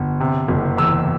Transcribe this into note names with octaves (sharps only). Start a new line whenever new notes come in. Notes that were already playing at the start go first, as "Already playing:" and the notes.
Already playing: G1
C3
F#1
E2 E6